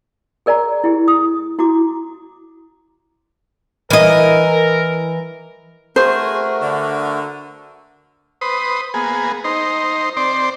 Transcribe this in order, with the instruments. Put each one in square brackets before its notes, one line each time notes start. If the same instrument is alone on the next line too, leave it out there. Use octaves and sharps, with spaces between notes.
[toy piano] G#4 A#4 D5 G#5 A#5
E4 G4 G#4
D#6
E4 F#4 A#5 D6
[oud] E3 D#5 [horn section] A#4
[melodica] A3 F#4 A#4 [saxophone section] G#4 [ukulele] C5
[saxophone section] D3
[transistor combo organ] B4 C5 D#6
A#3 B3 G#4
D#4 C5
C4 C5 D5